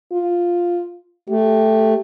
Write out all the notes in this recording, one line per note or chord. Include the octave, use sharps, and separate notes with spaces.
F4
A3 G4